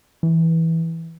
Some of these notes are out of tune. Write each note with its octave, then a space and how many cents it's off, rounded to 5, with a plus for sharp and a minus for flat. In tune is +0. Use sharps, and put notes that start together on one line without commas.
E3 -15